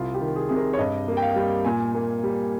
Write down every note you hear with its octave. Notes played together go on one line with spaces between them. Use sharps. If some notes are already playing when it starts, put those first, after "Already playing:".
Already playing: C2 F4
G4
D#3
G#4
C3 G#4
A#4
C#5
G2 D#5
A#3
G5
F5
G3
A#2 G#5
A#3
G3